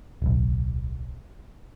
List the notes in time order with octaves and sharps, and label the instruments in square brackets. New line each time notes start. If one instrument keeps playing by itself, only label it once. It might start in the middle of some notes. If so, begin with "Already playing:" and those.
[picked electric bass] D1 B1